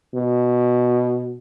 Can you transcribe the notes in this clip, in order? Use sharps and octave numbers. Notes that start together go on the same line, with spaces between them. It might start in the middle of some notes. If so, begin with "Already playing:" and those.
B2